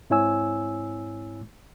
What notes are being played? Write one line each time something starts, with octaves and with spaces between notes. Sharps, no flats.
G#2 C4 E4 C#5 G#5 E6